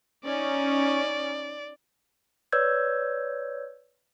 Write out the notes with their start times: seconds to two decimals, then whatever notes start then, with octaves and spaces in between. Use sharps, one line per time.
0.24 C#4 D#4 D5
2.52 B4 C#5 D5 E6 G6 G#6